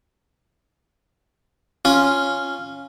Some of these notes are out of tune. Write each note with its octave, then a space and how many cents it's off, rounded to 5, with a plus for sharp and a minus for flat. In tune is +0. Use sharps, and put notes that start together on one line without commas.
C#4 +0 F4 +0